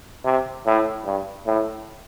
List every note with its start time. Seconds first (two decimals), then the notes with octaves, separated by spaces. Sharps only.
0.25 C3
0.66 A2
1.06 G2
1.47 A2